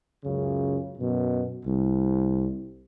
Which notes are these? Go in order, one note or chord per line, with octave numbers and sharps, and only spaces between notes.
C#2 F#2 C#3
F#2 B2
C2